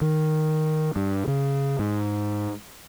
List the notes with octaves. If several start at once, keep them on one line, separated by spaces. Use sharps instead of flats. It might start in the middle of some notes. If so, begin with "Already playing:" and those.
D#3
G2
C#3
G#2